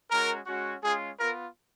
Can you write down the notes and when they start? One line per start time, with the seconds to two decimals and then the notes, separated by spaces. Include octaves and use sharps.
0.11 G#3 C#4 F#4 A#4
0.46 G#3 C#4 F#4
0.83 G#3 C#4 F4 G#4
1.19 B3 F4 A#4